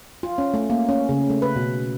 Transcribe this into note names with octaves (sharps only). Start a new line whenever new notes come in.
F4
C#4
A3
A#3
C#4
C#3
A3
B4
B2